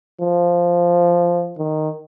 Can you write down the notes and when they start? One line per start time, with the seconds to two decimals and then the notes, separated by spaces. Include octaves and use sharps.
0.21 F3
1.58 D#3